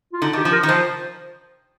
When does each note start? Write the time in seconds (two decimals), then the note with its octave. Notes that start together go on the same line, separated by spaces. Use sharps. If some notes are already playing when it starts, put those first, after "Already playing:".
0.13 F4
0.22 D3 D#4
0.33 D#3 G4
0.45 F3
0.52 A#4
0.63 D#3
0.68 F3 C5